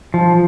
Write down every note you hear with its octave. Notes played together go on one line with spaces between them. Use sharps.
F3